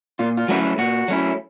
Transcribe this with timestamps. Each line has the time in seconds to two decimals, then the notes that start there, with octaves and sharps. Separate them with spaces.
0.19 A#2 F4
0.37 F4
0.48 F#3 A3 C#4 E4 F#4
0.78 A#2 F#4
1.08 F#3 A3 C#4 E4